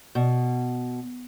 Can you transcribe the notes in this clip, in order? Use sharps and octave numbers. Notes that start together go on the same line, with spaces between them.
B2